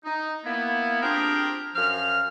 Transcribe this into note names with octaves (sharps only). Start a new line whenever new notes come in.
D#4
A#3 B3 E4
C4 D4 F4 G4 G#4 A#4
F#2 F3 F5 F6